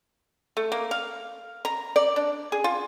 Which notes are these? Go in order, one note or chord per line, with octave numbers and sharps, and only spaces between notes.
A3
A#3
F5
A#5
D5
D4
G#4
F4